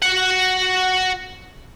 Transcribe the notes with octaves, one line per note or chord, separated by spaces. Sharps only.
F#4 F#5